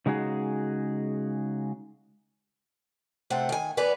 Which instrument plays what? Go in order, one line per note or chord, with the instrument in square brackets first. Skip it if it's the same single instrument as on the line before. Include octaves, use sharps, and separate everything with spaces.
[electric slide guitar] C#3 G#3 D#4 F#4 G#4
[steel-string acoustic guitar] D2 C3 A3 C4 F#5 G5
D#3 G#5
E2 B3 B4 D5 G#5